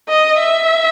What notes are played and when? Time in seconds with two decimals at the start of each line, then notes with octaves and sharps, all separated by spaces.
0.08 D#5
0.38 E5